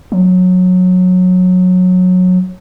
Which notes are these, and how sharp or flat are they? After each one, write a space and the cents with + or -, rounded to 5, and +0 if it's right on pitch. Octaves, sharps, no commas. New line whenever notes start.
F#3 -20